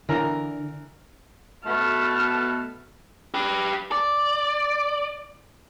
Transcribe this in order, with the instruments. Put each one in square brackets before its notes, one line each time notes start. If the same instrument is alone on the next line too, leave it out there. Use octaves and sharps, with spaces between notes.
[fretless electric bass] D3 [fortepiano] E3 A#4 A#5
[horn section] B2 A3 [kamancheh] A5 F6
[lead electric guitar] G4 B4
D5